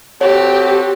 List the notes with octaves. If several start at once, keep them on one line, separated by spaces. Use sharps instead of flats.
C4 F#4 G4 A4 C#5